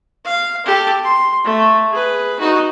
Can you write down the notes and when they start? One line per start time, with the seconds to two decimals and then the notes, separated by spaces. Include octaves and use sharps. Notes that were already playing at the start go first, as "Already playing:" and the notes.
0.25 F5
0.66 G4 A4
1.04 C6
1.44 A3
1.91 G#4 B4
2.39 D#4 F#4